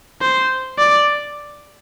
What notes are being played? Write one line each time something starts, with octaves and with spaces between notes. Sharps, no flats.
C5
D5